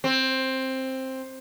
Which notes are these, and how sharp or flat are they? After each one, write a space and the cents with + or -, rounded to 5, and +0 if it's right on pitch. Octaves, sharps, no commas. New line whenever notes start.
C4 +10